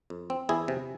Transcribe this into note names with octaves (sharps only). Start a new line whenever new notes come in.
F2
C4
E2 E4 G#4
C3